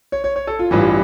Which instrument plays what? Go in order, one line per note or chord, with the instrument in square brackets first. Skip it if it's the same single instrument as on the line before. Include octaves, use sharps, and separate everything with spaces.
[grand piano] C#5
C#5
C#5
A4
F4
A1 G2 E3 F4